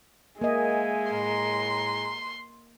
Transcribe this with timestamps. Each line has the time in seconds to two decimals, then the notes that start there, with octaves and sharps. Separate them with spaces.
0.41 G#3 A#3 D#5 E5 G#5
1.12 A2 A#5 C6